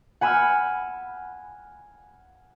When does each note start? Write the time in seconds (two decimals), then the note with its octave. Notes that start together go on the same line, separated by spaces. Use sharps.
0.21 F#5 G#5 B5 E6 F6